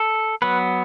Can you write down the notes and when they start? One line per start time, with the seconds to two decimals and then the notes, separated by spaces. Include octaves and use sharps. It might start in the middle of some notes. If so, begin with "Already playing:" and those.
Already playing: A4
0.42 F#3 B3 B4